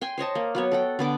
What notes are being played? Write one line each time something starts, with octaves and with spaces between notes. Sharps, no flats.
G5 G#5 C6
C5 C#5 D#5 A5
A#3
F#3 B3 C#5
A4 F#5 G5
D3 B3 D6